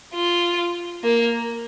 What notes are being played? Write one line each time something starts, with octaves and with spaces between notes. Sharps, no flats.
F4
A#3